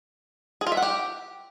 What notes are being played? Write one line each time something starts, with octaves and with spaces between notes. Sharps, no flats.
G#4
F4
E5
F#5
G4